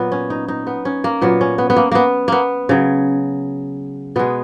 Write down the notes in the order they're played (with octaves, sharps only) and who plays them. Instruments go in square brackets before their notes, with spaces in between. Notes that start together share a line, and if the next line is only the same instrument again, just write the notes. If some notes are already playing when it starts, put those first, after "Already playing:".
Already playing: [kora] A#2 F#3 B3
C#4
D#4
D#4
B3
C#4
A#3
A#2 F#3 B3
C#4
B3
B3
A#3
A#3 B3
A#3 B3
C#3 F#3
B2 G#3 B3